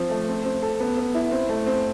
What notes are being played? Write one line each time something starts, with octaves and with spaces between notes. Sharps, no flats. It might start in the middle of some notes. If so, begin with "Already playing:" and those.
Already playing: F3 C4
A3
C4
C4
A4
B3
B3
E4
C4
A3
C4